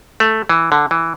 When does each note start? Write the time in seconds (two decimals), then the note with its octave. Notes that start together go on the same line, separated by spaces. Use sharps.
0.20 A3
0.49 E3
0.72 D3
0.91 E3